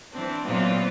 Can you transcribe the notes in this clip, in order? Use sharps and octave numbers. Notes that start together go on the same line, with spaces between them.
E3 C4 D4
A#2 E3 F#3 B3 C4 F4